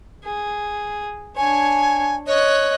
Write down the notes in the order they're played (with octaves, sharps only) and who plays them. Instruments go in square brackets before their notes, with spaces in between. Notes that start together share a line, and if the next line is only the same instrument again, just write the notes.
[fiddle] G#4
[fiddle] D4 C#5 [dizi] G#5
[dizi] C#5 [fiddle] D#5 F#6